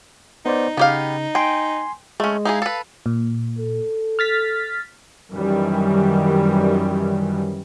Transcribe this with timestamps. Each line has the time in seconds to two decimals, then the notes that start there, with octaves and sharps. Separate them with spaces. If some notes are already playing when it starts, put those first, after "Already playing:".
0.46 B3 D#4 C5 D5
0.77 C#3 B3 G4 F5
1.35 G5 G#5 C6
2.20 G#3 A3 C#4
2.45 D#4 E4 G#4 F5
2.62 A4 B4
3.06 A#2
3.59 A4
4.19 F6 A6 B6
5.30 F#2 D#3 E3 G3